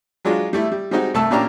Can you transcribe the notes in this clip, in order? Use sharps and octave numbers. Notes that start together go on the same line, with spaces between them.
F#3 G#3 D4 F4
G3 A3 E4
G3
G3 G#3 C4 D#4 F#4
C2 A3 A5 E6
A#2 A#3 C#4 D4 G4 A#5